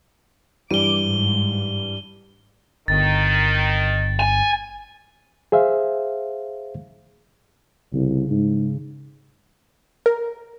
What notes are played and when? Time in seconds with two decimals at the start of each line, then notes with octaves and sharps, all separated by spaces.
0.71 G2 E3 G3 D6 D#7 G7
1.03 G#2
2.88 G1 D#3 A6
4.20 G#5
5.52 G#4 C5 E5 F5
7.94 C2 C#3
8.31 G#2
10.06 A#4